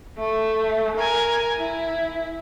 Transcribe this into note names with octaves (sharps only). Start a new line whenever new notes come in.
A3
A#4 G#5
E4